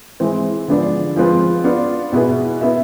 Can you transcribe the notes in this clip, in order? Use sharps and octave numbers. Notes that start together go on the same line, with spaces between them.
E3 G#3 C4 E4
D3 F3 G#3 B3 D4
F3 G#3 C4 F4 B4
B3 D4 F4
B2 B3 E4 G#4 B4
B3 E4 B4 E5